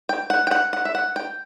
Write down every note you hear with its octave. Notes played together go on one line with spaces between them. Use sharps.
G5
F#5
G5
F#5
F#5
E5
F#5
G5